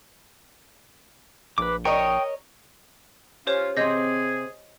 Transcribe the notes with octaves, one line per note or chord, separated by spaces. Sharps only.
A#1 B4 D6
A#4 C#5 D#5 G5 C#6
C#4 F4 G4 C5 C#5
C3 C4 G#4 D#5 G6 A#6